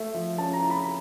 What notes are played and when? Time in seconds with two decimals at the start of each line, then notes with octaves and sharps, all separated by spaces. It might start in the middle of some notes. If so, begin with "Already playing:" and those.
Already playing: A3 E5
0.14 F3
0.38 C#4 A5
0.53 A#5
0.61 E4
0.70 B5